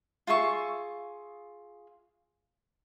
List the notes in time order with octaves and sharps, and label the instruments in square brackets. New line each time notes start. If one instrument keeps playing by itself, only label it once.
[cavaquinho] F4 G#4 E5 C#6